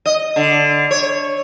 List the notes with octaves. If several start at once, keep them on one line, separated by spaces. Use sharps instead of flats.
D#5
D3
C#5